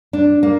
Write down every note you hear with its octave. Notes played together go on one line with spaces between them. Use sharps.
D4
A#3